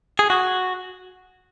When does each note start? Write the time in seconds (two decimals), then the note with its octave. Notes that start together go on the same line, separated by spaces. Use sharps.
0.19 G#4
0.30 F#4